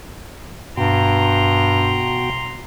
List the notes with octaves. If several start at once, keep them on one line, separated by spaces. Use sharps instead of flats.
G2 B2 F#4 G5 A#5 C6